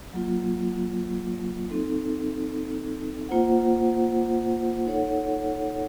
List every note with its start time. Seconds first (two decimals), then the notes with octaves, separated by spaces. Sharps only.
0.13 F#3 A#3 F4
1.71 C4 D#4 A4
3.29 A#3 F4 C5 F#5
4.86 D#4 A4 C#5 F#5